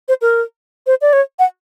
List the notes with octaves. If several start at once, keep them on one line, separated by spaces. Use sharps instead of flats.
C5
A#4
C5
D5
C#5
F#5